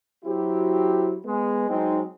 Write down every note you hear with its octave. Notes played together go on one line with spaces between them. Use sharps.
F#3 C4 E4 F#4 G4
G#3 B3
F#3 G#3 C4 D#4